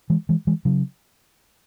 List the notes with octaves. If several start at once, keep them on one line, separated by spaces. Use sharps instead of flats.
E3 G#3
E3 G#3
E3 G#3
C#3 F#3